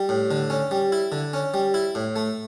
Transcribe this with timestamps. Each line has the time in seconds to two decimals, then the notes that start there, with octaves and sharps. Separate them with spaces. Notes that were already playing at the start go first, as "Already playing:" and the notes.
Already playing: G3
0.09 A2
0.31 D3
0.50 C#4
0.71 G3
0.92 E4
1.12 D3
1.33 C#4
1.54 G3
1.74 E4
1.95 A2
2.16 A3